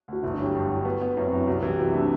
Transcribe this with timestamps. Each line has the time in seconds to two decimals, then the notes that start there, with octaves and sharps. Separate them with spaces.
0.08 D2 F#4
0.23 G1 E4
0.34 D4
0.38 F#3
0.44 G4
0.55 G2
0.70 F#3 E4
0.85 B3 F#4
1.01 B3
1.17 F#2 E4
1.27 C4
1.31 F#3
1.37 E4
1.47 C2 F#4
1.58 F#4
1.62 E3
1.68 G4
1.79 C3 F#4
1.90 E4
1.94 A3 D4
2.00 C4